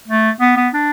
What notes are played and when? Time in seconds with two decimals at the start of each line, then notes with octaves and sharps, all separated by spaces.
0.07 A3
0.40 B3
0.57 B3
0.74 D4